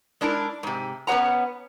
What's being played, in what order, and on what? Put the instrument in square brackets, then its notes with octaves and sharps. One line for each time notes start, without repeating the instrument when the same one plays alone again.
[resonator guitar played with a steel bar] G#3 D4 E4 A#4
G#2 C3
B3 C#4 G#4 C#5 F#5 A#5